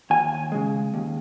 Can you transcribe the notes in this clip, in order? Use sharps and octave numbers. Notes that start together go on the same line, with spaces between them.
D#2 G#5
C#3 G#3
D#2